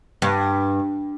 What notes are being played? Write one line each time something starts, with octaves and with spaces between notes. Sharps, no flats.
G2